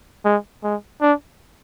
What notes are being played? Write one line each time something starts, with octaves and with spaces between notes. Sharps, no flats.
G#3
G#3
D4